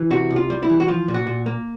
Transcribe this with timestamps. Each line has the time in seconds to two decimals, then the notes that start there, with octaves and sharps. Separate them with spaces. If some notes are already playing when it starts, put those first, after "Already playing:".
Already playing: E3
0.10 C3 F#4
0.31 C2
0.36 F4
0.50 G3
0.63 E4
0.69 E3
0.80 F#4
0.88 F3 F4
1.08 A#2
1.14 F#4
1.27 A#2
1.46 A#3